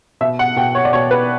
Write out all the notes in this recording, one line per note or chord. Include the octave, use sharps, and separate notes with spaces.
B2 E5
F#5
B2 G5
C#5
D5
B2 C#5
B4